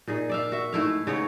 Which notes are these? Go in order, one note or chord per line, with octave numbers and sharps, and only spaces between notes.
A#2 D#4 G#4
D5 E5 F5
F#4 E5
G#2 A3 E4 F5
C#3 B3 D#4 C#5